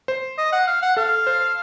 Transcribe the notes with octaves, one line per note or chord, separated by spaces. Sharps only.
C5
D#5
F#5
F5
F#5
A4 F5
C5